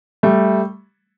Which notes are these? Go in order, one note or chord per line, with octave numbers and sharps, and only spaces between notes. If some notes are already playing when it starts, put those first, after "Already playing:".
G3 A3